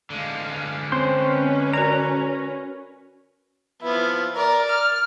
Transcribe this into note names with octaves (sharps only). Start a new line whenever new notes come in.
D3 G#3 F5
C4 C#4 B4 C5 C6
F#4 A#4 D5 A#5
F3 B3 E4
A#4 D5
F6